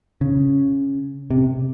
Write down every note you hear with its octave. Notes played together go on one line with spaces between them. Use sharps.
C#3
C3